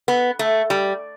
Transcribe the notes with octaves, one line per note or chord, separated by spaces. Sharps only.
B3
A3
G3